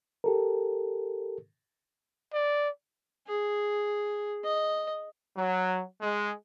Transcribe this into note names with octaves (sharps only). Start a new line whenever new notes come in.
G4 A4 A#4
D5
G#4
D#5
F#3
G#3